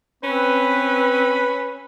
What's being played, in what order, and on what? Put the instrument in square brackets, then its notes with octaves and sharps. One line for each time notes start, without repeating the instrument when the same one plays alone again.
[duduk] C4 [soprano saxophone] C#4 [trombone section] B4 [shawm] B5